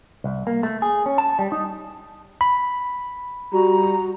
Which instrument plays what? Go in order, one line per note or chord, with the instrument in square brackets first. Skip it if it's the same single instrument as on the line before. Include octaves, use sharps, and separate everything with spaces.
[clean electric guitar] C2
A#3
A3
G#4
C#4
A5
G3
D#4
[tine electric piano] B5
[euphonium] G3 [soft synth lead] F#4 [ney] A#5